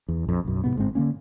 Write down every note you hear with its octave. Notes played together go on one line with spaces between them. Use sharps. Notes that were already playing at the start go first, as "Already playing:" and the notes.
E2
A#1 F2
B1 F#2
G#2 C3 B3
G1 G#2 G#3 C4
D3 D#3 A#3 C#4